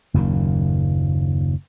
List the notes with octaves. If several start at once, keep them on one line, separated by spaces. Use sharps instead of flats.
F#1 D#2 A#2